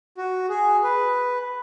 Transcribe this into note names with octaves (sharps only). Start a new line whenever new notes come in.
F#4
G#4
B4